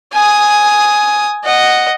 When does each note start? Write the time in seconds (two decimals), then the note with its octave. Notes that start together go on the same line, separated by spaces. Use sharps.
0.13 G#5 D#6
1.44 D#5 F#5